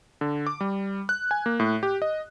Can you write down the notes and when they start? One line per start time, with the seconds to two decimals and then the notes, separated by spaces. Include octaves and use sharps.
0.21 D3
0.46 D6
0.61 G3
1.09 F#6
1.31 G#5
1.46 A#3
1.60 A2
1.83 G4
2.02 D#5